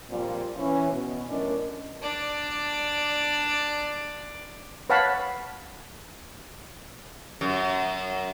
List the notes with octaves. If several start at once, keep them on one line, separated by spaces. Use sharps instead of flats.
G2 A#2 F3 G3 C4
E3 C#4
B2
F#2 A2 C#4 D4 A#4 D#5
D4 D5
B4 C#5 F5 F#5 A5 B5
F#2